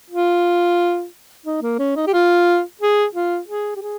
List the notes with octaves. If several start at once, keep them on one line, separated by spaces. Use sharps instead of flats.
F4
D#4
A#3
C#4
D#4
G4
F4
G#4
F4
G#4
G4
G#4